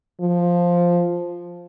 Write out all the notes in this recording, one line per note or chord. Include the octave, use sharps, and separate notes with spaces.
F3